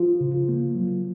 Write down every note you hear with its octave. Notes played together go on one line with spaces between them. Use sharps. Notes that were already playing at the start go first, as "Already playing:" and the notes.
Already playing: F3 F4
C#3
A#3
F#3